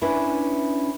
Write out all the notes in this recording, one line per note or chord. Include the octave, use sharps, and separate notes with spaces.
C#4 D4 E4 B4